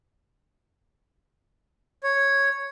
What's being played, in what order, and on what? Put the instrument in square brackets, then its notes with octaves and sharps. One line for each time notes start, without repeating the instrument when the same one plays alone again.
[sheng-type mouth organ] C#5